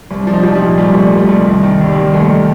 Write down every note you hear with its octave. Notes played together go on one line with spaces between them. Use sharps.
C2
D4
F3
D#4
G3
C2 F3
G3
A#2
G3
C2 G3
C2 A3
G3
C2
A3
C2
D#3
D#3
D#2 G3
G3
D#3
G3
D#2 A3
D#3